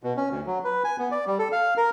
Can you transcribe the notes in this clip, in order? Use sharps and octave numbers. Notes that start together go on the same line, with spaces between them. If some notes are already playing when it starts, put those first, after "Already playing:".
B2
C#4
D2
F#3
B4
G#5
B3
D5
G3
A4
F5
A#4